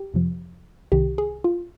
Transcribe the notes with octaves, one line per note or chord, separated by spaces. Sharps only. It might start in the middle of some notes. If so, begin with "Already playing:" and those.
Already playing: G4
F2 C3 F3
C2 C3 D#3 G4
G#4
F4